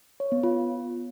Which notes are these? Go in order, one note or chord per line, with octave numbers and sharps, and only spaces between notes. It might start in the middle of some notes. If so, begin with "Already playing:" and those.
C#5
B3
F4